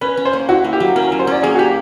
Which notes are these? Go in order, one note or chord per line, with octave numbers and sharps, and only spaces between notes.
C#4 B4
C#4
C5
A#3
E4 F#4
A#3
G4
F#3
C#4 A#4
A#4
F#3
C5
C#4 D5
A#3 G#4
F#4
A#3 G4